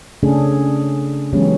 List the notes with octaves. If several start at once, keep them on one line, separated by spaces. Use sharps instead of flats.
C#3 A3 C#4 D4 G#4 A4
E3 F#3 G#3 B3 C#4 G4